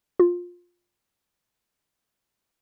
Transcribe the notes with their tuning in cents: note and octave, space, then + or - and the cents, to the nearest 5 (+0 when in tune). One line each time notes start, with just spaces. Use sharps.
F4 +15